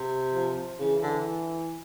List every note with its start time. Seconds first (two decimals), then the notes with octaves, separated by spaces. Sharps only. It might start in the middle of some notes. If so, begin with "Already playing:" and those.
Already playing: C3
0.33 F3
0.79 C#3 E3
1.02 D3